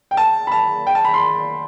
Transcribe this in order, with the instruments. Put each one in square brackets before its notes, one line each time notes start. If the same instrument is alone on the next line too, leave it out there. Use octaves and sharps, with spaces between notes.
[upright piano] G5
A5
B5
A5
G5
A5
B5
C6